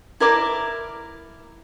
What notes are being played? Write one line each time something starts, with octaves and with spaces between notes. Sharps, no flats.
E4 A#4 D5 D6